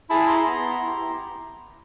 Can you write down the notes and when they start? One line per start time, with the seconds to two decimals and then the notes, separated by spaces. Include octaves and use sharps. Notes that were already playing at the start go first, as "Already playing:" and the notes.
0.10 E4 G#4 A5 B5
0.28 A#5 C6
0.46 B3
0.82 E4 G4